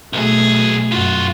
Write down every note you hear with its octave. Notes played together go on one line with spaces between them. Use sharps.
B1 B2 A3 G#4
F#2 F4 F#4